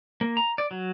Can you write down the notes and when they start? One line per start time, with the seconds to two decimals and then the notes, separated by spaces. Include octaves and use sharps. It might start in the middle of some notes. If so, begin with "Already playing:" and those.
0.21 A#3
0.37 A#5
0.58 D5
0.71 F#3